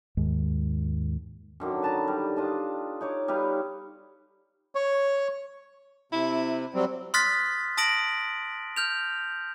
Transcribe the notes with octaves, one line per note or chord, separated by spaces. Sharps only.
D#2 G#2
F#2 D3 D#3 F#3
B4 A5 A#5
G3
D4 F4 D#5 A5
D#4 C#5 D6
G3 D#4 B4 F5
C#5
C3 E4
F#3 G3 C4
C6 D#6 F6 F#6 A6 B6
A5 D#6 A#6 D7 F#7
F6 G6 F7